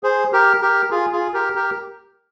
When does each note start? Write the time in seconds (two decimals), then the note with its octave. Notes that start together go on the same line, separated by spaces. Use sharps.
0.03 G#4 C5
0.33 G4 A#4
0.61 G4 A#4
0.91 F4 G#4
1.12 F4 G#4
1.34 G4 A#4
1.55 G4 A#4